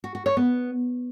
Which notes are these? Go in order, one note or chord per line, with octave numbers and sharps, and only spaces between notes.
F#4
F#4
C#5
B3